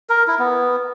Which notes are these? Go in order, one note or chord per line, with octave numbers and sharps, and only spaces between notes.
A#4
E4
B3